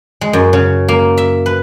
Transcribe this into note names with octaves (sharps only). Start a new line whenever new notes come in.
G#3
F#2
C#3
A#3
E5
B4